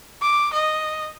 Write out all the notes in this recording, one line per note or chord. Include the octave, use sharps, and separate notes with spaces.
D6
D#5